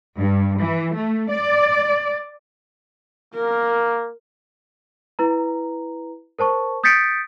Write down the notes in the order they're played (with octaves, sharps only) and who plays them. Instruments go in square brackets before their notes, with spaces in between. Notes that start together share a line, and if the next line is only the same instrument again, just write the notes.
[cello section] G2
E3
A3
D5
[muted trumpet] A#3 [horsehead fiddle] A#4
[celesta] E4 B4 A#5
A#4 C5 A5 C#6
D#6 G6 A6 B6 C#7 D7